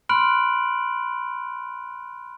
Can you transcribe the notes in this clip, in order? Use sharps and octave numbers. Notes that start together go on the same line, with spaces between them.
B5 C6 F6 F#6 D7 F#7